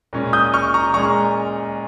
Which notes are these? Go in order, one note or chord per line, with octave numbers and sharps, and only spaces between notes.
A#2 G#3 C#4
D#6 G6
C#6 F6
A#5 C#6
A#2 G#3 C#4 A#5 C#6